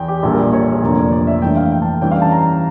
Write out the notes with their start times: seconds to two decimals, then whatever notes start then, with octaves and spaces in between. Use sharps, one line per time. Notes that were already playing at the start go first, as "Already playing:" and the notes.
Already playing: E2 G5
0.08 G4
0.23 A#1 A#2 G3 A#3 A4
0.33 A#4
0.43 D5
0.53 C#5
0.83 F1 F2 D3 F3 A#3 D5
0.97 C#5
1.12 D5
1.27 E5
1.42 G2 E3 A3 D4 G5
1.57 F5
1.72 G5
1.82 A5
2.02 G2 E3 G3 C#4 G5
2.11 F5
2.22 A5
2.32 A#5